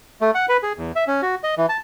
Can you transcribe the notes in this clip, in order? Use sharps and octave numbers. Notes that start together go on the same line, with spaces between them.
A3
F#5
B4
G#4
E2
E5
C#4
F#4
D#5
E3
A5